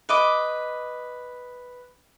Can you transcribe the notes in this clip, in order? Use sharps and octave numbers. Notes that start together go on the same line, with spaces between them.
B4 D#5 D6